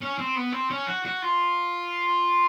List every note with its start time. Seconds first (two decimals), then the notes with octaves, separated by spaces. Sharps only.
0.01 C#4
0.18 C4
0.36 B3
0.52 C4
0.70 C#4
0.87 F#4
1.05 F#4
1.22 F4